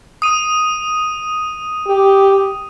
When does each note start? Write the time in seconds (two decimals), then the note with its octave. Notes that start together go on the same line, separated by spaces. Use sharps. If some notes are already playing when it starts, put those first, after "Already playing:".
0.22 D#6 D#7
1.87 G4